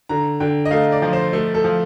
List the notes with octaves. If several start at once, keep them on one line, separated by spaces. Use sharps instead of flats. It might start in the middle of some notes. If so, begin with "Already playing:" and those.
D3 A#5
D3 G5
D#5
A3 F5
D5
F3
C5
A3
A4
F3